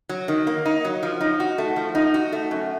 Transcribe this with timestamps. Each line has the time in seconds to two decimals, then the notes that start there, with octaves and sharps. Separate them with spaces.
0.09 F#3
0.28 D#3
0.47 A#3
0.65 D#4
0.84 F#3
1.03 F3
1.21 D#4
1.40 F#4
1.58 A3
1.76 F3
1.95 D#4
2.14 F#4
2.32 A3
2.51 F#2